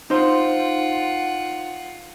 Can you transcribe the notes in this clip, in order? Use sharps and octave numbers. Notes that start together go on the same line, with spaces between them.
D#4 F4 C5 F#5